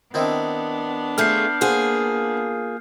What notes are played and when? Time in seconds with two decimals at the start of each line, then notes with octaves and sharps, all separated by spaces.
0.14 D#3 B3 C4 D4 E4
1.18 A3 F4 G#4 F6 G6 C7
1.61 A#3 F4 G#4 C5 F#5